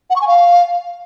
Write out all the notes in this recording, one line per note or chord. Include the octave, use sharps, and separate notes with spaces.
F#5
C#6
G#5
F5